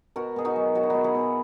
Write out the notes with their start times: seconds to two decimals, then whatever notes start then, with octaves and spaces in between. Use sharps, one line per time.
0.16 B2 F#4 A#4
0.36 B2 G#4
0.45 D#4 F#4
0.56 F#3
0.75 F#3 F#4
0.83 E4
0.90 B2 D#4 F#4
1.04 E4 G#4
1.15 B2